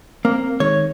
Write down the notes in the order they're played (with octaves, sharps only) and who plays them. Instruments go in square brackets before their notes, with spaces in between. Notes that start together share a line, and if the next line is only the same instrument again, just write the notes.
[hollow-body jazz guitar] A#3 [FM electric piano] C4
[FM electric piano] D#3 G#3 [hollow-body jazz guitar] C#5